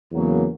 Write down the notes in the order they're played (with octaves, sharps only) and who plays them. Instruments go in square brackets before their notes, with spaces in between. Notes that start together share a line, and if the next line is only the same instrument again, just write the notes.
[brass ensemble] E2 C#3 F#3 A#3